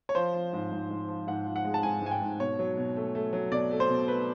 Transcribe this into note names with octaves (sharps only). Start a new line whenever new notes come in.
C#5
F3 C5
F3
G#2
G#2
G#2
F3
G#2 F#5
F3
F#5
G#3
A5
G#2 G#5
G#2 G#5
G5
G#2
B2 C#5
F#3
B2
A3
A3
F#3
B2 D5
A3
C5
B2
A3 B4